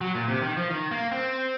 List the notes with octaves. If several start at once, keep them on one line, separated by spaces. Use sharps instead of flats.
F#3
A#2
C3
D#3
F3
D#3
A#3
C4